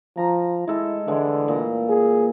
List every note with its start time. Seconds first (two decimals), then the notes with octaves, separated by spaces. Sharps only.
0.17 F3 A#5
0.68 G#3 E4 A4
1.07 D3 E3 G#3
1.48 A#2
1.90 G#4